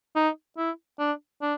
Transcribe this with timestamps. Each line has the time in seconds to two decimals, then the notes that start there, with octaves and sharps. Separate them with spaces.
0.16 D#4
0.58 E4
0.99 D4
1.42 D4